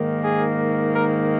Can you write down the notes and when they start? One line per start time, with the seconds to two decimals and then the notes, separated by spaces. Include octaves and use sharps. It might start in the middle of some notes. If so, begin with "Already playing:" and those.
Already playing: G#2 D#3 A#3
0.23 G#4
0.95 A#4